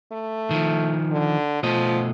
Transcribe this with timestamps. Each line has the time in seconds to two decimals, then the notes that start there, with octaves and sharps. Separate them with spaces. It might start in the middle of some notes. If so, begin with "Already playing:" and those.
0.12 A3
0.51 D#3 F3
1.12 D3
1.63 B2 F3 A3 D#5